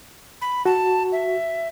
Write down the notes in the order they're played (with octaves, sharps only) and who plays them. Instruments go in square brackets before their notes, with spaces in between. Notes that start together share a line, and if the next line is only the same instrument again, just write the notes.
[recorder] B5
[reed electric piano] F#4 [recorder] A5
[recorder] E5